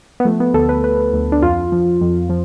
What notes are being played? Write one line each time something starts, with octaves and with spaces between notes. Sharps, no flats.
B3
F3 A3
B3
D2 A4
B4
D2 B4
D2
D4
F2 F4
F3
F2
F3